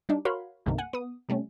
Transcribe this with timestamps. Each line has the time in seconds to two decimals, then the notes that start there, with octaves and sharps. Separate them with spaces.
0.09 G3 D4 D#4
0.25 F#4 A#4 C#5 F5 B5 C6
0.66 C2 G2 C3 D#3 A3 A#3
0.78 F#5 G#5
0.93 B3 D#6
1.29 C3 G3 A3 C#4